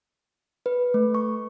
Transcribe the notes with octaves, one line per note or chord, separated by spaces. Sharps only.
B4
A3
C#6